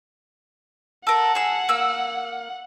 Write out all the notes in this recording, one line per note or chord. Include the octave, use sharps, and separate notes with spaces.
A4 A#4 F#5
G#4 E6
A#3 E6